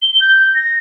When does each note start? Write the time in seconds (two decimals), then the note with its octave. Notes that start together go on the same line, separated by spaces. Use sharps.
0.02 G7
0.20 G6
0.55 A#6